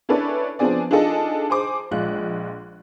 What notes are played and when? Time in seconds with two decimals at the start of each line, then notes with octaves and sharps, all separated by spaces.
0.09 C#4 D4 E4 A4 B4 D5
0.59 F3 B3 C4 D4 G#4 D5
0.91 D4 D#4 F4 G#4 A4 D#5
1.50 G#4 C5 D6
1.91 A#1 G#3 F4 F#6